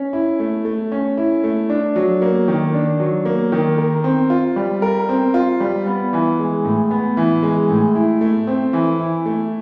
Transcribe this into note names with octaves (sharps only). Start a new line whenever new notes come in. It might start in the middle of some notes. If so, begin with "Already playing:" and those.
Already playing: C#4
E4
A3
A3
C#4
E4
A3
D4
F#3
A#3
D#3
D4
F#3
A#3
D#3
A#4
C4
F4
G3
A#4
C4
F4
G3
B3
E3
G#3
A2
B3
E3
G#3
A2
E4
A3
C4
E3
E4
A3